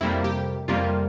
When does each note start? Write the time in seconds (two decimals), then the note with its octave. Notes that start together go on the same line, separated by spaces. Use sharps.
0.01 F2 C3 G3 A#3 E4
0.24 G4
0.68 F2 C3 G3 A#3 F4